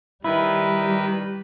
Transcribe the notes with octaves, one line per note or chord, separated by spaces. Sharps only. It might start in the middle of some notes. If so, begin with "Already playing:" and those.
D#3 G3 E4 B4